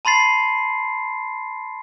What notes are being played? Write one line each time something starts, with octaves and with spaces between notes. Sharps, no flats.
A5 B5 C6 A6 C7